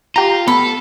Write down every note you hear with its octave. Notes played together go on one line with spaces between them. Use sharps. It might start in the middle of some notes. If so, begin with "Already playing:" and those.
F4 G4 A#5
B3 A4 B5